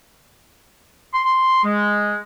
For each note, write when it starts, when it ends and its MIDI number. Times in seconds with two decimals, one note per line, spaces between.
1.14 1.64 84
1.64 2.17 56